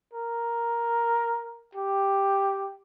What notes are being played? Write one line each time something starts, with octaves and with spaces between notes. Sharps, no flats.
A#4
G4